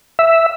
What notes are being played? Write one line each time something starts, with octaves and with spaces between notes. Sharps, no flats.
E5